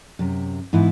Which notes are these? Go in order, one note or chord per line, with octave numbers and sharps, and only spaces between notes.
F#2 C3
G#2 E3 B3 E4